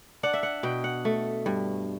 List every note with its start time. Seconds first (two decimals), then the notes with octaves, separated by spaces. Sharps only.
0.23 D4 F#5
0.33 E5
0.43 F#5
0.63 B2 G5
0.84 F#5
1.05 A3
1.46 G2